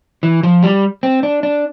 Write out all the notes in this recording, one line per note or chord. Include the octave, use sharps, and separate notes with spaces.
E3
F3
G3
C4
D4
D4